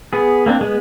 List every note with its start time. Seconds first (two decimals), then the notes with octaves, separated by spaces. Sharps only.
0.13 B3 G#4
0.46 A#3 C4 D4
0.61 G#3 B3